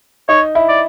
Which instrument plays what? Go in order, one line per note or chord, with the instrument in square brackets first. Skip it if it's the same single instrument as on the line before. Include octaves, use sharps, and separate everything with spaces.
[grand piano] D#4 [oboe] C#5
[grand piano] E4
[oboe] D5